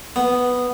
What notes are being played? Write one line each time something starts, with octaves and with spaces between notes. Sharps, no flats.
B3